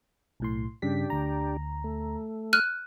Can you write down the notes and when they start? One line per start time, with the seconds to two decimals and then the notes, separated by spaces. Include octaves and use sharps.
0.40 B1 A2 C6
0.82 G2 C#3 D4 G4 B6
1.10 D2 A#5
1.84 A3
2.53 F6 F#6 D#7